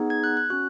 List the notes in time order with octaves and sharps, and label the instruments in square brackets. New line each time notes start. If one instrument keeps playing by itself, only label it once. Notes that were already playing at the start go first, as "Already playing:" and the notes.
Already playing: [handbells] B3 D#4 G#4
G#6
F#6
F#6
C#4 F#4 F#6